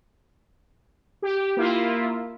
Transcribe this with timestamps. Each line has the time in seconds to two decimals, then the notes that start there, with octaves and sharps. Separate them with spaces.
1.22 G4
1.57 A#3 E4 F4